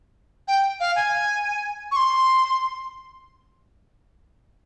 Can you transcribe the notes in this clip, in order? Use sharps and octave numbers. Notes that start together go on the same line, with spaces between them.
G5
F5
G#5
C#6
C6